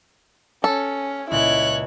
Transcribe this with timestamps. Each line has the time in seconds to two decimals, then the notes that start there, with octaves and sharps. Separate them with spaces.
0.64 C#4 A4
1.31 C#2 A#2 E4 C#5 F#6